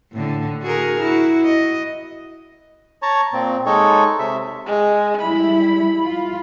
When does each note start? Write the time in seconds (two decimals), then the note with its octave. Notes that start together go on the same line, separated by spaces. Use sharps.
0.12 A2 D3
0.62 F#4 G#4 A#4
1.00 E4 F#4
1.44 D#5
3.02 C#5 A5 A#5
3.33 A#2 C4
3.66 G#3 D#4 A4 C#5
4.19 C3 E5
4.66 G#3
5.21 G3 E4 B5
6.02 F4